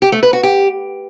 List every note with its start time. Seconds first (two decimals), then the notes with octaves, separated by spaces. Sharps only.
0.02 G4
0.12 A3
0.23 B4
0.33 F#4
0.43 G4